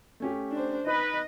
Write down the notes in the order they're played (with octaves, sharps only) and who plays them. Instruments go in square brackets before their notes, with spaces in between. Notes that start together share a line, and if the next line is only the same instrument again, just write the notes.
[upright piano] A3 C#4 G4
[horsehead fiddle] D4 C5
[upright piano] D#4 [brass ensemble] B4 [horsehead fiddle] D#5